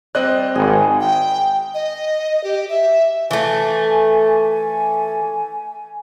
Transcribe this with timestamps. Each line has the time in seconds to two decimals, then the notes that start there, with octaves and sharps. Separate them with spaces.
0.15 G3 C4 C5 D5 D#5 F#6
0.56 G#1 G#4
1.01 G5
1.74 D#5
2.44 G4
2.69 E5
3.31 E3 A3 G#5